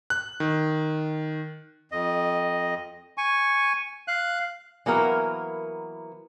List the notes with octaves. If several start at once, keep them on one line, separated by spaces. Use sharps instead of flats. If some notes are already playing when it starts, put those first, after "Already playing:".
F#6
D#3
F2 D#5
G#5 C#6
F5 F#6
E3 F#3 A#3 B3 E4 A#4